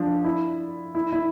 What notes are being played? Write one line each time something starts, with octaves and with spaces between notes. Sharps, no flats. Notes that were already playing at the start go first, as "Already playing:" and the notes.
Already playing: F3 D4
E4
E4
E4